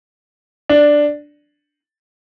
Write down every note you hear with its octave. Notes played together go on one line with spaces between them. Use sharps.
D4